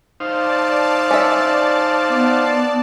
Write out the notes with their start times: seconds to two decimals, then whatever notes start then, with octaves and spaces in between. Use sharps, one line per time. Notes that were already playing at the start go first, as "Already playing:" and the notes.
0.20 D#4 C5 D5 F5 A5
1.11 C#4 E5
2.09 B3